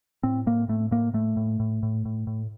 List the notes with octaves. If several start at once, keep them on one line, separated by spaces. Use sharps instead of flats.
A2 C4
A2 A#3
A2 A3
A2 A#3
A2 A3
A2
A2
A2
A2
A2